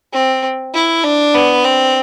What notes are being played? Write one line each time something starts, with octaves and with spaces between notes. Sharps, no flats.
C4
E4
D4
B3
C4